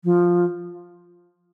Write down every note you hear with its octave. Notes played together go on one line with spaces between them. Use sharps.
F3